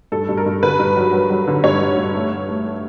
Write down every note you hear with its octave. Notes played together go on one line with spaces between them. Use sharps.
G2 A4
G2
A#4
G2
D3 B4
G2
F#3
F#3
F#3
D3
G2 C#5
G2
G2
A3
A3
A3
A3